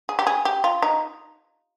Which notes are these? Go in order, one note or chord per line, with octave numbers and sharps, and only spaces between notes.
G#4
G4
G#4
G4
F4
D#4